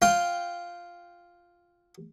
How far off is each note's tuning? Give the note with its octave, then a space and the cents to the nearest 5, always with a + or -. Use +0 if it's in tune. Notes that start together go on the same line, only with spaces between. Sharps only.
F4 +0 G5 +0